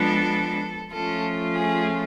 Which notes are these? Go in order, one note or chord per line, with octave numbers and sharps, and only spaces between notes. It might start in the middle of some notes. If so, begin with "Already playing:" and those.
Already playing: F3 G#3 B3 D4 A4
F3 A3 C#4 F4 A4
G#4